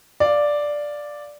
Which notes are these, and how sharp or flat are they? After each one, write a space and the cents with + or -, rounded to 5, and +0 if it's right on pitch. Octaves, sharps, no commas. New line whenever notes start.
D5 +0 F5 +0